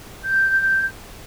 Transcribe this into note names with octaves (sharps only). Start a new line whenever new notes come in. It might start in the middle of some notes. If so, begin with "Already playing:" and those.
G6